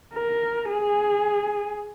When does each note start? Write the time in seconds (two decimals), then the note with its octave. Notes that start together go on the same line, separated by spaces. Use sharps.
0.14 A#4
0.69 G#4